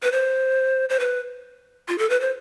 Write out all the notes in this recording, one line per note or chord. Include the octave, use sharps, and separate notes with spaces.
B4
C5
C5
B4
F4
A4
B4
C5